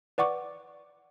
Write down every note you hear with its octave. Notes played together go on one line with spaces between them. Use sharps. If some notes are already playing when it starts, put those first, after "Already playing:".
B4 D5 F#5 C#6 D6